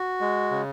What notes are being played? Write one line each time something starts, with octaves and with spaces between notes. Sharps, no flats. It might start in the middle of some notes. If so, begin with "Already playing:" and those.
Already playing: F#4
G#3
C#3